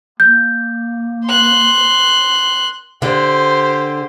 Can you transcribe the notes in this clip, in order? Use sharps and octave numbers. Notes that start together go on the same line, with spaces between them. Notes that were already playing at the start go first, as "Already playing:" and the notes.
A#3 G6
C6 F#6
D3 G4 C5